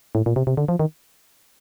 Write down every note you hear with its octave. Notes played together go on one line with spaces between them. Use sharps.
A2
A#2
C3
C3
D3
F3
D#3